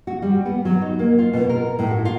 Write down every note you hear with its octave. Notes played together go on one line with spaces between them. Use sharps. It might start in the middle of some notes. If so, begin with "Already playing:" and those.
F#4
G3
B3
F#3
D#4
A#3
F4
B2
A#4
A2
F#4
F4